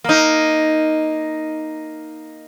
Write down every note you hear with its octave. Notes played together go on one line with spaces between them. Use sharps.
A#3 D#4